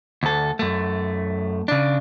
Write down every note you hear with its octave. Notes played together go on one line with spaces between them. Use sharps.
D2 A4
F#2 A3
C#3 D4